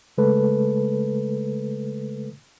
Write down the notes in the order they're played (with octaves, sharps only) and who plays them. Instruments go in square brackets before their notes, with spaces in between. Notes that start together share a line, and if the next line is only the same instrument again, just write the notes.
[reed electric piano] C#3 G#3 A3 A4 B4